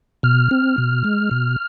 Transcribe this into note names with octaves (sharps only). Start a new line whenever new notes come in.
B2 F6
C4
B2
G#3
B2